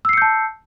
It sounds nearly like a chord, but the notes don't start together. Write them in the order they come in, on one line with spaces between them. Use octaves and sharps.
E6 C7 C#7 G6 A5